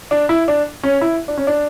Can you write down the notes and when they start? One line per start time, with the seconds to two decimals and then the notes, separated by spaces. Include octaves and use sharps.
0.11 D4
0.29 E4
0.48 D4
0.83 C#4
1.01 E4
1.28 D4
1.37 C#4
1.47 D4